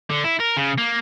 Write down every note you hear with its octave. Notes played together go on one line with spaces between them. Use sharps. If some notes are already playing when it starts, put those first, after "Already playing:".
D3
E4
A#4
C#3
A#3